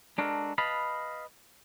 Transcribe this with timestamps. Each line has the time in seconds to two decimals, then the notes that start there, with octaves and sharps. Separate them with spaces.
0.18 G#3 D4 F#4 A4 A#4
0.58 B4 D#5 F5 A5 B5